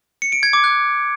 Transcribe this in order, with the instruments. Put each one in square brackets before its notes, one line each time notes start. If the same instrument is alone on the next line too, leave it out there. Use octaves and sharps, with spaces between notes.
[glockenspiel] C#7
D7
G#6
D6
F#6